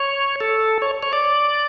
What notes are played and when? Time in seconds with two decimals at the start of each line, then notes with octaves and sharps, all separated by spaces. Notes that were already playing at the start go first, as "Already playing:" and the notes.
Already playing: C#5
0.41 A4
0.82 C#5
1.03 C#5
1.13 D5